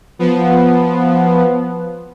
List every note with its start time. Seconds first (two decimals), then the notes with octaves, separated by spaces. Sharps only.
0.19 F3 B3